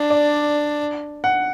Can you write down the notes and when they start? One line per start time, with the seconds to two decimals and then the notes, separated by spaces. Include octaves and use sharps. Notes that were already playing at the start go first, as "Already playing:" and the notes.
Already playing: D4
0.10 D5
1.24 F#5